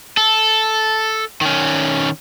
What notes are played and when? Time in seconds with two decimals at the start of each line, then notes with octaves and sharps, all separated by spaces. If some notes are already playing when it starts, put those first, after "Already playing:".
0.17 A4
1.41 D#3 C#4